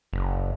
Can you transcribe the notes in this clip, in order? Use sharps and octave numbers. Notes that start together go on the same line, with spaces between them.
F#1